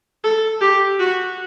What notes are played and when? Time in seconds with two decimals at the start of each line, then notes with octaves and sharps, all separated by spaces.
0.24 A4
0.61 G4
0.98 F#4